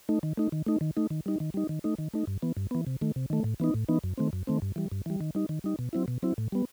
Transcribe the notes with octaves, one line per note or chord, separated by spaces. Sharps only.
A3 D#4
D#3
A3 D#4
D#3
A3 D#4
D#3
A3 D#4
D#3
G3 D#4
D#3
G3 D#4
D#3
A3 D#4
D#3
A3 D#4
G2
E3 B3
G2
E3 B3
C3
D#3 A3
C3
D#3 A3
A2
E3 B3 D#4
A2
E3 B3 D#4
F#2
D#3 A3 C4
F#2
D#3 A3 C4
G2
E3 G3
G2
E3 G3
D#3
G3 D#4
D#3
G3 D#4
B2
F#3 C4 E4
B2
F#3 C4 E4
A2
G3 B3